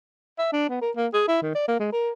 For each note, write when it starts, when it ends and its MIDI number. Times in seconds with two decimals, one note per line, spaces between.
0.39 0.49 76
0.53 0.68 62
0.69 0.81 59
0.82 0.91 70
0.96 1.07 58
1.14 1.26 68
1.28 1.39 64
1.43 1.52 51
1.55 1.66 74
1.68 1.79 58
1.80 1.90 56
1.92 2.11 70